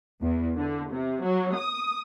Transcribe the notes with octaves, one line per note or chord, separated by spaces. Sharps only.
E2
D3
C3
F#3
D#6